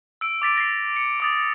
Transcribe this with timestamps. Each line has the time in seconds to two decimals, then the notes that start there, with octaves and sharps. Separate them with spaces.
0.21 E6 D7
0.42 D6 A6 B6 D7
0.57 A#6 C7
0.96 C#7
1.20 D6 D#6 A6